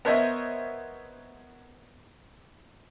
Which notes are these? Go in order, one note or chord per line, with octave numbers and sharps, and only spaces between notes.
B3 A#4 C5 C#5 D#5 E5